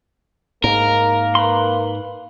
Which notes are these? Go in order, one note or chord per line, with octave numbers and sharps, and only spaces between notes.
G#2 A#3 A#4
B4 B5 C6